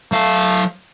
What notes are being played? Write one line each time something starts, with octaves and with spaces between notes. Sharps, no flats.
F#3 A3 F5